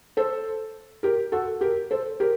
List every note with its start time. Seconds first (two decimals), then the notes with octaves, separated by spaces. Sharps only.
0.17 A4 C5
1.03 G4 A#4
1.32 F#4 A4
1.61 G4 A#4
1.91 A4 C5
2.20 G4 A#4